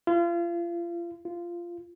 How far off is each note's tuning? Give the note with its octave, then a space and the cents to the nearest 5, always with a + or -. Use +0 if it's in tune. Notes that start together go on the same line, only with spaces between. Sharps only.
F4 -35
F4 -15